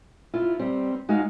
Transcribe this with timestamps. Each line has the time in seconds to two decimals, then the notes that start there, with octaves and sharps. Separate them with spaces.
0.34 E4 F4
0.59 G3 C4
1.09 G#3 D#4 F#4 F5